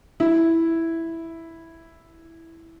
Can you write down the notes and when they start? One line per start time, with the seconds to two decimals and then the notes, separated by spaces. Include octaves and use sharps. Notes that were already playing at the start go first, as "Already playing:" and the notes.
0.20 E4